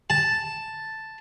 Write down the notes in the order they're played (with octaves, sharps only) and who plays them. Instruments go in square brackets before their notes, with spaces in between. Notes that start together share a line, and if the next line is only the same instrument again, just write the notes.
[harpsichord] A5